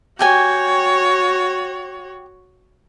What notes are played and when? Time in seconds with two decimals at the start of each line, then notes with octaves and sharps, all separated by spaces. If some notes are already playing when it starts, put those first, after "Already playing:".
0.19 F#4 G4 C#5 G5 G#5